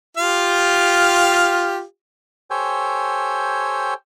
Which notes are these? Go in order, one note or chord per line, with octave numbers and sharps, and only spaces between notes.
F4 G4 F5
G4 A4 C5 C#5 G5 G#5